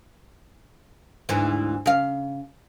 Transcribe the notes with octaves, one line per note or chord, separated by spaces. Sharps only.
D2 G#2 E3
C#3 F5